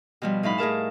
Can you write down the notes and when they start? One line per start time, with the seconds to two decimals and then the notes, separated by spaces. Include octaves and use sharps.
0.22 B2 F3 G3
0.43 A2 D#4 F5 B5
0.58 A2 G#4 A#4 A5